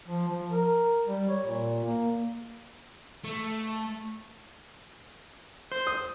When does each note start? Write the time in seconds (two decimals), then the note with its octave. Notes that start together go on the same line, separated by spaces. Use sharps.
0.08 F3
0.28 F3
0.50 A#4
1.06 G3
1.29 C#5
1.45 A#2
1.84 A#3
3.24 A3
5.72 C5
5.87 D#6